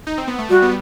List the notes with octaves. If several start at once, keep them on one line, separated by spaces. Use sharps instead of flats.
D#4
C4
B3
A3
G3 F#4
B3